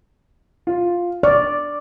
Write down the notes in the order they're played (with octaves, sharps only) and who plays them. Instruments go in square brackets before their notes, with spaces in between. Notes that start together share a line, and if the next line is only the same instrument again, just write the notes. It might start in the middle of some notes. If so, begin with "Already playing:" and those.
[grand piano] F4
[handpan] D5 [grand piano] C#6 F6